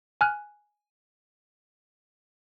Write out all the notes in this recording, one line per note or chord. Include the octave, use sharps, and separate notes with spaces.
G#5 F6 F#6